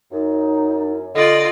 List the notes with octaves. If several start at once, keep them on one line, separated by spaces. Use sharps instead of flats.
F#2 D#4
D3 F4 D5 D#5